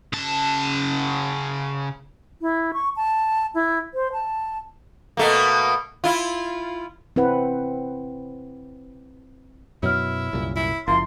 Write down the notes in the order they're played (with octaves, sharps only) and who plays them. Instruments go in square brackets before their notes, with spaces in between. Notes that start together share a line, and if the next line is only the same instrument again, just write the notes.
[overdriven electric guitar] C#3 A5
[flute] E4
C#6
A5
E4
C5
A5
[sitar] B2 A3 A#3
E4 F4
[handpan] C4 E4 B4 F#5
[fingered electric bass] F#2 B2 F#3 [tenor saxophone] E4 [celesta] C#5 F6
[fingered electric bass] C2 F#2 A#2
[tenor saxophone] E4
[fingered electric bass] F#1 F3 [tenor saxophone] A#3 [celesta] E4 E5 [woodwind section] C6